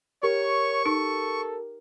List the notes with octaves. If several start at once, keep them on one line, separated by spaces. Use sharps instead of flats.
G4 A#4 C#5 C#6
D#4 A4